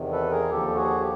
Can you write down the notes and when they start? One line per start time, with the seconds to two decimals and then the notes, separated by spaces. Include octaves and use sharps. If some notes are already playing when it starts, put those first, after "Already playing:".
Already playing: E2 C3 D#3
0.12 A4 B4
0.31 G#4 A#4
0.50 D#2 D3 F3 G4 A4
0.75 F#4 G#4
1.01 G4